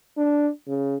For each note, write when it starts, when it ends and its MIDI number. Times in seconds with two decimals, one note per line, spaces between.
0.17 0.49 62
0.68 0.96 49